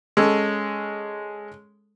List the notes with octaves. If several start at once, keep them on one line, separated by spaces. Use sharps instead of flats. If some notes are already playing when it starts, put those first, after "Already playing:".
G#3 C#4 A4